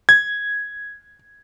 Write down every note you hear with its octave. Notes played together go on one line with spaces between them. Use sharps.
G#6